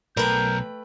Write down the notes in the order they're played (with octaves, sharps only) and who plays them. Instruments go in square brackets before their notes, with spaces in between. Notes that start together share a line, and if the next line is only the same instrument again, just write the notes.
[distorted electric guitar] B1 [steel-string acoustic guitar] A3 B4 G5 [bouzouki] A#4 [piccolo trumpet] G6